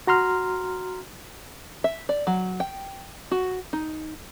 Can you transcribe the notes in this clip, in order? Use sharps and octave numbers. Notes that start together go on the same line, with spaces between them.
F#4 A#5 C6 F6
E5
D5
F#3
G5
F#4
D#4